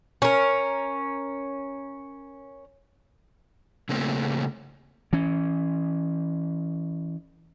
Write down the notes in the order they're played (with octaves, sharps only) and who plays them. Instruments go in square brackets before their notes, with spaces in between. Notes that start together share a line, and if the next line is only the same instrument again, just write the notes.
[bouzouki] C#4 A#4
[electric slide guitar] C#3 A3 A#3 C4 C#4
[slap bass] E3 C#4